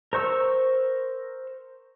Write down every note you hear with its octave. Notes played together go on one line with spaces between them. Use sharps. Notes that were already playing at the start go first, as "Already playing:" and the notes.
A#4 C5 C#6 E6